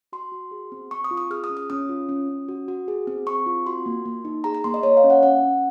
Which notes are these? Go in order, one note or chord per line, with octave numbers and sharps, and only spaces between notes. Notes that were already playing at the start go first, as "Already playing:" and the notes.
F#4 C6
F#4
G#4
C4
C4 C#6
D#6
F4
D#6
G#4 F6
D#6
C#4
D#6
C#4 D#6
F4
C#4
C#4
F#4
F#4
G#4
C4
C4 C#6
F4
F#4 C6
A#3
A#3
D#4
G#4 A#5
A#5
A#3 C6
D#5
A#3 C#5
F5
C#4
F#5
C#4 F#5
C#4